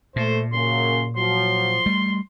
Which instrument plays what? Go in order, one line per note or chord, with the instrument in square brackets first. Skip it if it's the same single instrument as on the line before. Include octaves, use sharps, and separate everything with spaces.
[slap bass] A#2 [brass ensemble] A3 [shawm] C5
[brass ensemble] F#2 C#3 A#3 [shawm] C6
[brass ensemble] F3 F#3 [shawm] C6
[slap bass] G3 A3